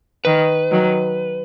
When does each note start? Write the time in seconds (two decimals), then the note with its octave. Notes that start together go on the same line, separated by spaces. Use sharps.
0.25 D#3 B4
0.71 D#3 F#3